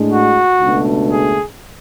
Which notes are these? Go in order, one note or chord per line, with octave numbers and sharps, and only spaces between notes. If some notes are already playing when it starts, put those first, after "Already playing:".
Already playing: A2 G#3 D4
F#4
C#2 B2 A3 D4
G#4